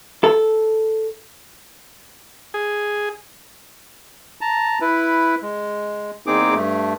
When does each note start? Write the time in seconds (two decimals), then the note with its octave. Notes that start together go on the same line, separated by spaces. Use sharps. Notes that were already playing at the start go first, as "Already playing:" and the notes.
0.24 A4
2.54 G#4
4.41 A5 A#5
4.81 E4 B4
5.42 G#3
6.27 E2 A#3 C4 D#4 G#4 D6
6.55 G2 A3